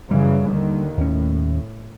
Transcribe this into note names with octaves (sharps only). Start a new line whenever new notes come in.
F#2 C#3 E3 G3
D#2 D3 D#3
D#2 A2 C#4